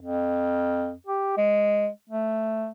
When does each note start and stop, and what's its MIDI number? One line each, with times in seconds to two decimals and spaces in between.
0.01 0.92 41
1.06 1.36 67
1.37 1.88 56
2.09 2.69 57